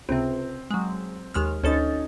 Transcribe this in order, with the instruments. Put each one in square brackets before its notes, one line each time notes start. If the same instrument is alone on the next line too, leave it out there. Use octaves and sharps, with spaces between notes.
[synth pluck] C#2 C3 [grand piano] C4
[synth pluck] F#3 G#3
D#2 G#3 F6
[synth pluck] D2 A4 A6 [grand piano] C#4 D#4